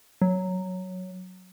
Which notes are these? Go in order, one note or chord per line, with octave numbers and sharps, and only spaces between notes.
F#3